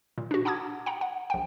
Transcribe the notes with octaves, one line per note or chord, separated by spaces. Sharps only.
A#2
D4 F#4
F#5 A5 A#5 D6 D#6 G#6
F#5 G5 A#5
F#5
A#1 G5